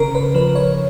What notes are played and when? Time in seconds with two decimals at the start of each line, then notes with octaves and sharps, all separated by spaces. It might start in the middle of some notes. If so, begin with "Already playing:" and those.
Already playing: C#3 A#4
0.15 B4
0.34 F3 B4
0.55 C#5